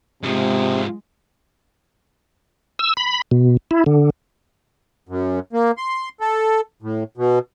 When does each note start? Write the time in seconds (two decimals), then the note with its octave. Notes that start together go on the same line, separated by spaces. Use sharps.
0.23 G#2 C3 F3 G#3
2.79 E6
2.97 B5
3.31 B2
3.71 E4
3.86 D3
5.09 F#2
5.53 A#3
5.78 C6
6.20 A4
6.82 A2
7.17 B2